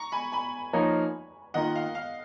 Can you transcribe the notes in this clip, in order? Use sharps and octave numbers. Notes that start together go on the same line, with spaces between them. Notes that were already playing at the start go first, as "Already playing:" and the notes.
Already playing: A#5 C#6
G#5 B5
G#5 B5
F3 A#3 D#4 A#4 C#5
D#3 A#3 F4 D#5 F#5
F5
F5